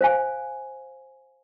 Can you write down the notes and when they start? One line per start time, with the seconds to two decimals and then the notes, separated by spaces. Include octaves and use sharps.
0.01 C5 F5 G#5